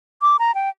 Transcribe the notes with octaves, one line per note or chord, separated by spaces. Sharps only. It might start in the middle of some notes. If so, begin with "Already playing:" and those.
D6
A#5
G5